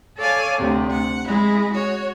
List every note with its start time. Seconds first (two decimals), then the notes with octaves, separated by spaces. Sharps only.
0.17 A4 C#5 D5 F5 G#5
0.58 D2 C3
0.91 F#5
1.27 G#3 E4
1.73 F#4 C#5